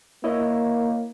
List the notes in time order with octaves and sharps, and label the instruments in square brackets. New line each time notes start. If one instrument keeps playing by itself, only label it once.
[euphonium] A#3 [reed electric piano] E4 C#5 D#5